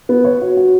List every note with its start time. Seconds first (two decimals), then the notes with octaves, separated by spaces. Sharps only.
0.09 B3
0.24 C#5
0.41 F#4
0.57 F#4